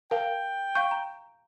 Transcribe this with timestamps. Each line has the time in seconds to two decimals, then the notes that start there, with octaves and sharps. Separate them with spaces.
0.11 A#4 F5 G5 A5
0.75 F5 C#6 G6
0.91 A#5